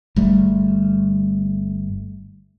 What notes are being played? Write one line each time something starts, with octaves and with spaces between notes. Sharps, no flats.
G1 G3 A3